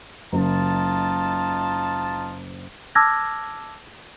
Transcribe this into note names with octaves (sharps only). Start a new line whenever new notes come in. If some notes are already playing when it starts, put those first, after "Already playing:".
F#1 D#4 F4 A5
A5 D6 E6 F6 G#6 A#6